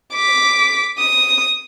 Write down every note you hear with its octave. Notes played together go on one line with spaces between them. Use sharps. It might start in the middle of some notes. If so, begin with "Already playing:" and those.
D6 B6
D#6